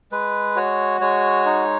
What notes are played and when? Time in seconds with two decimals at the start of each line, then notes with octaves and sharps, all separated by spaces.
0.12 G#3 B4
0.56 F#4 C#5
1.01 G#3 C#5
1.46 D#4